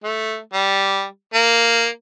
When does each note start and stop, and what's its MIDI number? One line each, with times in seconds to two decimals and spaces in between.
0.04 0.38 57
0.53 1.05 55
1.34 1.87 58